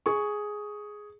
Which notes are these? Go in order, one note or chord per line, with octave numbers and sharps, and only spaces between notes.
G#4 C#6